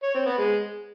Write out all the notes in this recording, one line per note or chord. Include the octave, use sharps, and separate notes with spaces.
C#5
C4
B3
G#3